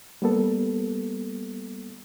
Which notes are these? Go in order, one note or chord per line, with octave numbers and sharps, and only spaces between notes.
G3 A#3 B3 A4